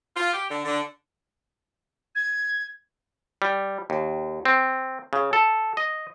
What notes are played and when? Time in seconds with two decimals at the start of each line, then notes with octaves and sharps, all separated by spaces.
0.16 F4
0.33 G4
0.49 D3
0.65 D3
2.15 G#6
3.42 G3
3.90 D#2
4.45 C4
5.13 C#3
5.33 A4
5.77 D#5